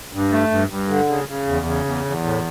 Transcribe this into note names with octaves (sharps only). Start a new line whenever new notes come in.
G2
A3
G2
G2
D3
C#3
C#3
E2
C#3
E2
E2
A2